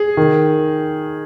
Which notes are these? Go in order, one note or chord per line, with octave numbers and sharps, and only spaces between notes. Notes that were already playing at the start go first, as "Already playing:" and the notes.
Already playing: G#4
D#3